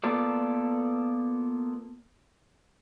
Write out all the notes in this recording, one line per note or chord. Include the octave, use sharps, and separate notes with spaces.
A#3 B3 F4 A4 D5